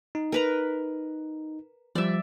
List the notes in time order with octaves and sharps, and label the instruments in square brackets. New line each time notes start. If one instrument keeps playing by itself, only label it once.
[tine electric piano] D#4
[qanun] A#4 B4 A#5
[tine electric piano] F3 G3 [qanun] D5 E5